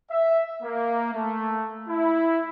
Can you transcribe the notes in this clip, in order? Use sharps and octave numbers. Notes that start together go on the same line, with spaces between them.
E5
A#3
A3
E4